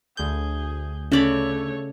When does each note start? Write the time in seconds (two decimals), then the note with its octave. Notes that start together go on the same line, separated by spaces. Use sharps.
0.17 D2 G#4 G6
1.12 C#3 A3 C#4 C#5 D5 B5 B6